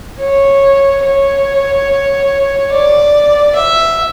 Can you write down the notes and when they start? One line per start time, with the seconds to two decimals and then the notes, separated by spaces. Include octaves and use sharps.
0.20 C#5
1.05 C#5
2.72 D5
3.56 E5